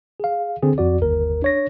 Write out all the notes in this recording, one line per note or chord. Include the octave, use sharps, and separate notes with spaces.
G#4 F5
D3 C4 G#4
F2 F#4 D5
G1 D#2 A#4
D4 C#5 A#6